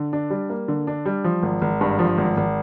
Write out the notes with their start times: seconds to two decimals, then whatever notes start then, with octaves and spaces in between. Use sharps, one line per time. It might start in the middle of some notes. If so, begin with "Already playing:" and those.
Already playing: D3
0.13 D4
0.30 G3
0.50 A#3
0.68 D3
0.87 D4
1.06 G3
1.24 F3
1.43 G#1
1.62 G#1
1.81 G2
1.99 F3
2.18 G#1
2.37 G#1